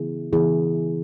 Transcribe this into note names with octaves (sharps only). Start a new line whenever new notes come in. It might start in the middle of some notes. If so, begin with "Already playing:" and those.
Already playing: C#3 E3 B3 E4 G#4
C#3 E3 B3 E4 G#4